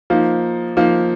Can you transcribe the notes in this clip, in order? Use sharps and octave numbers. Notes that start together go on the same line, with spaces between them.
F3 A#3 D#4
F3 A#3 D#4